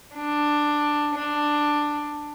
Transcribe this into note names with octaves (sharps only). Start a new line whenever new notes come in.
D4
D4